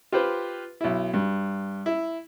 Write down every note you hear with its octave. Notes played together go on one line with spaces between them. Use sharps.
F4 G4 B4 C5
B1 E4
G2
E4